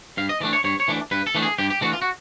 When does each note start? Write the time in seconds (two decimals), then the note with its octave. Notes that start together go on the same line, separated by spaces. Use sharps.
0.17 G2 F5
0.29 D#5
0.40 E3 A3 D4 D5
0.53 C#5
0.64 G2 C#5
0.80 C#5
0.88 E3 A3 D4
1.11 G2 B4
1.27 A4
1.35 E3 A3 D4
1.42 G#4
1.58 G2 G4
1.70 G4
1.81 E3 A3 D4 F#4
1.93 F4
2.02 F#4